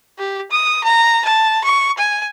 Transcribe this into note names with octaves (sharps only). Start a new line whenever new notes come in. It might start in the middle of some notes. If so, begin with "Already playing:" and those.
G4
D#6
A#5
A5
C#6
G#5